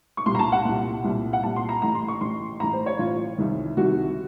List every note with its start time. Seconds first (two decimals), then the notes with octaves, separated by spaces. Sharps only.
0.17 C#6
0.26 C2 A#2 C6
0.35 A#5
0.39 A5
0.52 F#5
0.65 C2 A#2
1.04 C2 A#2
1.33 F#5
1.43 C2 A#2 A5
1.56 C6
1.69 A#5
1.82 A1 A2 A#5
1.95 C6
2.08 C#6
2.21 A1 A2 C6
2.60 A1 A2 A#5
2.73 C5
2.86 C#5
2.99 A1 A2 F4
3.38 C2 C3 D#3
3.77 C2 C3 D#3 F#4